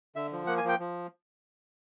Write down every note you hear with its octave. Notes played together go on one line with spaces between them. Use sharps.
D3 E5
F3
A#3 F#5
G#5
F3 G5
F3